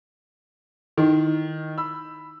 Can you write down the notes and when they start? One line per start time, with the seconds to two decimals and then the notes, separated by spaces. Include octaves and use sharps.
0.98 D#3 D#4 E4
1.78 B5 E6